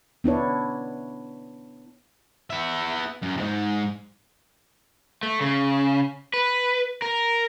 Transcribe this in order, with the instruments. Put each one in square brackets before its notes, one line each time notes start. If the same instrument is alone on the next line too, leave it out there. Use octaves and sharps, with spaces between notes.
[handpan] B3 D4 E4 C#5
[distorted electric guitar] B3 E5
F#2
E2 G#2
[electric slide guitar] A3
C#3
B4
A#4